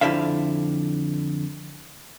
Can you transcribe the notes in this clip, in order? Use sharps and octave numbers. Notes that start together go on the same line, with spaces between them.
F2 D3 E4 C5 E5 F5